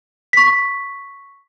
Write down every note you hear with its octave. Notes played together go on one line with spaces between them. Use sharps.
C#6 B6